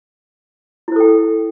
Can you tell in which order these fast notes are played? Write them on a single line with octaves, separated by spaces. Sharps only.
E4 C5 A4 G5